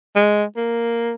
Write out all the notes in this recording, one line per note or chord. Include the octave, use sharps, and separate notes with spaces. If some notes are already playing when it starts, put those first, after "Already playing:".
G#3
A#3